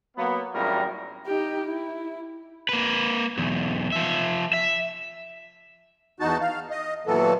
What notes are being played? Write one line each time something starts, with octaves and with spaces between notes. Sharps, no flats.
F#3 A#3 B3
G#1 F#2 A2 G3 F4 A#4
D#4 G4
E4
A#3 B4
B1 E2
F3 E5
E5
E2 D#4 F#4 A5
F5
D#5
D#2 A#2 E3 F#3 B3 A4